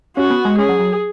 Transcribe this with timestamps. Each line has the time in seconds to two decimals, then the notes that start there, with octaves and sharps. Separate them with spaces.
0.17 C#4 F#4
0.30 B3
0.45 G#3
0.58 C#4 G#4
0.69 F#3
0.79 F#3